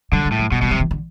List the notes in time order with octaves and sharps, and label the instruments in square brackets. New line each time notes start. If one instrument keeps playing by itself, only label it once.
[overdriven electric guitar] D3 [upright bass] F#3
[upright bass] G3
[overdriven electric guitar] A2
[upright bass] F#3
[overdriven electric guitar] B2 [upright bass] G3
[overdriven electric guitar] B2 [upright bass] G3
[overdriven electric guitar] C3 [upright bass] F#3
[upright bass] E3
D3